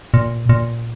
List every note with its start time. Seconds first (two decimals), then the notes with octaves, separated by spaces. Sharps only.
0.14 A#2
0.49 A#2